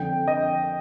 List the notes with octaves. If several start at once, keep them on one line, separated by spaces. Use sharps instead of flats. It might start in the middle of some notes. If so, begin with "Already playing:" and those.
Already playing: F2 D3 G5
D#5